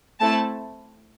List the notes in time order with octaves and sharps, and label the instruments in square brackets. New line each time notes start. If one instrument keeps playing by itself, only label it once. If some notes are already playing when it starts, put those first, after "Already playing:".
[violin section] A3 C4 E4 A5